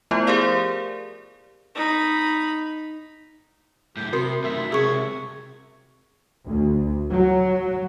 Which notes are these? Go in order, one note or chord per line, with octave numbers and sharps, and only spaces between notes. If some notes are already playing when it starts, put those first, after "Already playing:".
F3 A3 B3 E4 F4 C5
G4 G#4 A#4 C5 D5 F5
D#4 B5
F#2 A2 G4
C3 F#4 A#4 C6
F#2 A3 E5
C#2 C3 G#4 C#5 C#6
D2
F#3